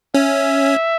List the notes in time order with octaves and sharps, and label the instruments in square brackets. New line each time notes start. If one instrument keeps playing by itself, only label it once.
[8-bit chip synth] C#4 [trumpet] E5